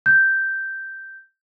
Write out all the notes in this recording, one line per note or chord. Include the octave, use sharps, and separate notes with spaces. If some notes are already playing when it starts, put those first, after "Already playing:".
G6